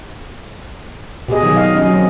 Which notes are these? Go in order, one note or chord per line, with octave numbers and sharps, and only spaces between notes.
B2 G4 G#4 D#5
D#3 F#3
D#5 F5
F#3 C#4 D#5
F#3 C4